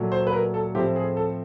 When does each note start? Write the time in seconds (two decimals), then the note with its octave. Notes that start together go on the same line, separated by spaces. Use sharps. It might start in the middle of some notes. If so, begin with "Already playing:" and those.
Already playing: A#2 F#3 A3
0.12 C5
0.27 B4
0.33 A#4
0.54 A4
0.74 A2 F3 A3 C4 G4
0.96 G#4
1.17 A4